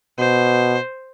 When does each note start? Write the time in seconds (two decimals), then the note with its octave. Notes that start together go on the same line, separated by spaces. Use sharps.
0.19 B2 C5